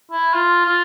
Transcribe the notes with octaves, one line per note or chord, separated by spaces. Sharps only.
E4
F4
F4